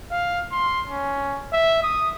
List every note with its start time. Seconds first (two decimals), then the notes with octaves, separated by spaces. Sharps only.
0.11 F5
0.51 C6
0.88 C#4
1.52 E5
1.83 D#6